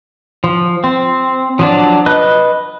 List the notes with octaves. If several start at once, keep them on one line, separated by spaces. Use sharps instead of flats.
F3
C4
F3 F#3 D4
B4 D#5 F#6